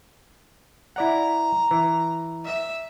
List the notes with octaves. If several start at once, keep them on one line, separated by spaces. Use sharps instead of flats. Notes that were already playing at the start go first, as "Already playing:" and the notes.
E4 D5 F#5 A#5
E3
E5